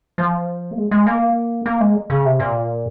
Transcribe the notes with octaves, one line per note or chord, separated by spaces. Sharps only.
F3
A#3
G#3
G#3
A#3
A#3
G#3
C#3
C3
A#2